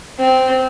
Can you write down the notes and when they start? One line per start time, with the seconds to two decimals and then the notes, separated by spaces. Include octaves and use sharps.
0.19 C4